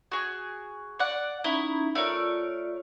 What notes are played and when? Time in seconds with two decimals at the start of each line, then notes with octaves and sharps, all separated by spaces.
0.12 F#4 G#4
0.99 D5 F#5
1.44 C#4 D#4 E4 A#5
1.95 A3 F4 A#4 C#5 D5